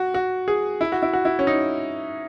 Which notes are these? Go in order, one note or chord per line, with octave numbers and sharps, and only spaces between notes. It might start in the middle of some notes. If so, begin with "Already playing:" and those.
Already playing: F#4
F#4
G#4
E4
F#4
E4
F#4
E4
C#4
D#4